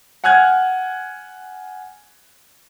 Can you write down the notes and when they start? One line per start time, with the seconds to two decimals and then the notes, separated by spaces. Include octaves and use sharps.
0.24 F#5 G#5 F6 F#6 G#6